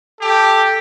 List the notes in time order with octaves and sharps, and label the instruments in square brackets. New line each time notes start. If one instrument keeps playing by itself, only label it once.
[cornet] G4 [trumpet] A4